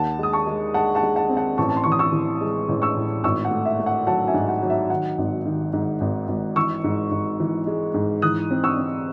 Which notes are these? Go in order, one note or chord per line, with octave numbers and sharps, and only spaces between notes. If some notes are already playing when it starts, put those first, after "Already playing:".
Already playing: D#2 F#5 A5
G#3 D#6
A5 C#6
G#3
G#3 F#5 A5
F#5 A5
G#3
F#5 A5
C4
F#5 A5
A1 A5 C#6
A5
C6
E3 C#6
D#6
C#6 E6
E3
G#3
A1
C#6 E6
A2
G#1 C#6 E6
F#5
A3
E5
A3
F#5
F#3 F#5 A5
E5 G#5
G#2
F#5
F#3
E5
D#3 F#5
G#1
D#3
G#2
G#1
G#1
E3 C#6 E6
G#2
G#2
E3
G#3
G#2
E3 D#6 F#6
C4
C#6 E6
C4